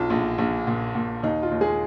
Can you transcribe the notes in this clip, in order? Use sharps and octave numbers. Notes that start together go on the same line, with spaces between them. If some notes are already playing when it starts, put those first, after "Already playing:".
Already playing: B1 F4
A#1
A#1
A#2
A#2
D#2 D#4
F4
D#2
G#3 G#4